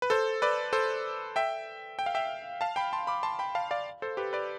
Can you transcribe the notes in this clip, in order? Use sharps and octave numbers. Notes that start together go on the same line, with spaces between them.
B4
A4 C5
B4 D5
A4 C5
E5 G5
G5
F5
E5 G5
F5 A5
G5 B5
A5 C6
B5 D6
A5 C6
G5 B5
F5 A5
D5 F5
A4 C5
G4 B4
B4 D5